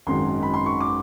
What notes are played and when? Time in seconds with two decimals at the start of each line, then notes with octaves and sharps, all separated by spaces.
0.07 G#1 F#2 D#3 G#3 C6
0.43 B5
0.54 C6
0.66 C#6
0.80 D6